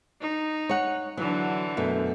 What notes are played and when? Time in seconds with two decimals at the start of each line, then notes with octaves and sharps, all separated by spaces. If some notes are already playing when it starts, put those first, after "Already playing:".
0.21 D#4
0.69 C#5 F#5
1.17 D3 E3 F#3
1.77 F#2 B2 A3